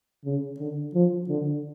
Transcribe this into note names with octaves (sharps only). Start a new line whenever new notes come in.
C#3
D3
F3
D3